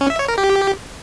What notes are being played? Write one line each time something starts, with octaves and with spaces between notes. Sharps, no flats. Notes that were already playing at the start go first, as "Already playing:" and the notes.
C#4
E5
C#5
A#4
G4